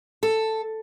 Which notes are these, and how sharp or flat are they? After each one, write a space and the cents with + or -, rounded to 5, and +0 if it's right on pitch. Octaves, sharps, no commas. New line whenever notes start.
A4 +5